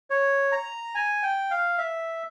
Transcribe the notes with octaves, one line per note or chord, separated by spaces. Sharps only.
C#5
A#5
G#5
G5
F5
E5